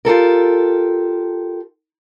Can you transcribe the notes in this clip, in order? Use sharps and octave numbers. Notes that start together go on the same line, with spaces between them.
F4 G4 A4 A#4